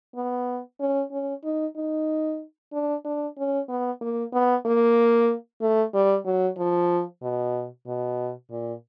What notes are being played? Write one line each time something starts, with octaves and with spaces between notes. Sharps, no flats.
B3
C#4
C#4
D#4
D#4
D4
D4
C#4
B3
A#3
B3
A#3
A3
G3
F#3
F3
B2
B2
A#2